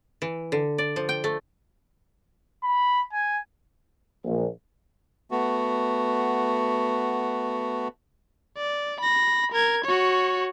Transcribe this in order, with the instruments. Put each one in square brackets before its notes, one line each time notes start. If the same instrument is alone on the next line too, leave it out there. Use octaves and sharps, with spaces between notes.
[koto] E3
D3
D5
F3
G5
A3
[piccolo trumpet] B5
G#5
[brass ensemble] A#1
[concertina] A3 B3 F#4
[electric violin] D5
B5 A#6
A#4 G#6
F#4 C#5